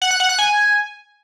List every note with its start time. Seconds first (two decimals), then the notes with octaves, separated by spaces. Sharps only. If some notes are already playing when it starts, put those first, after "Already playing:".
0.02 F#5
0.11 F#6
0.20 F#5
0.29 F#6
0.39 G#5